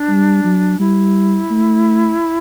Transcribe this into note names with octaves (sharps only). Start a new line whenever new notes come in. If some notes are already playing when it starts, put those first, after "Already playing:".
Already playing: D4
G3
F#3
G3 E4
A3